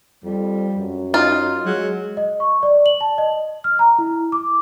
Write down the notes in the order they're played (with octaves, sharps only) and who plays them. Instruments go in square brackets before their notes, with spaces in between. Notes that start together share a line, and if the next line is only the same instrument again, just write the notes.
[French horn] F2 [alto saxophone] G3
[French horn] F#2
[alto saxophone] D#4 [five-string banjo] F4
[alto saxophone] F#3 [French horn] G#3
[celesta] D#5
C#6
D5
F#7
A5
D#5
F6
A#5
E4
D6